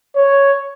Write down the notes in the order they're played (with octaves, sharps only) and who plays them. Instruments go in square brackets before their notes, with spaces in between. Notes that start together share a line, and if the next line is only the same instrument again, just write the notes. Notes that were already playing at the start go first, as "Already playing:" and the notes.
[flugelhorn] C#5